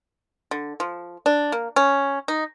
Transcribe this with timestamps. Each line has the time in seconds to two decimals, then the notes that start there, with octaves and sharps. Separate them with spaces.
0.51 D3
0.80 F3
1.26 D4
1.52 A#3
1.76 C#4
2.28 D#4